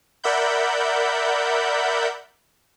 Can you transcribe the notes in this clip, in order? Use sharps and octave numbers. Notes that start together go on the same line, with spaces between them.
A#4 D5 E5 F#5 B5 G6